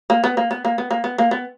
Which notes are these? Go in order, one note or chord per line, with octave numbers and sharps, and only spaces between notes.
A#3
B3
A#3
B3
A#3
B3
A#3
B3
A#3
B3